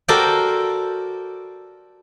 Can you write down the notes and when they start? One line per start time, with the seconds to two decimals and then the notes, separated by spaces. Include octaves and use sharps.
0.08 F#4 A4 A#4 C5 D5 G5